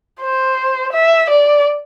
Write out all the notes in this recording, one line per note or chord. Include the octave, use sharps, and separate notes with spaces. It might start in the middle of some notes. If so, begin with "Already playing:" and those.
C5
E5
D5